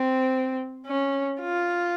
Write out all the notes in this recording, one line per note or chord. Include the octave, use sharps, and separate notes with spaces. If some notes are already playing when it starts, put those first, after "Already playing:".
Already playing: C4
C#4
F4